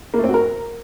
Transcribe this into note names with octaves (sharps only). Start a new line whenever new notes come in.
A#3
A3
C4
F#4
A#4